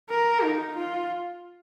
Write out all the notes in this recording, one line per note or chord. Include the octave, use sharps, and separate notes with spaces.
A#4
D#4
F4